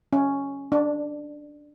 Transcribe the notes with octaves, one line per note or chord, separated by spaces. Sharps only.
C#4
D4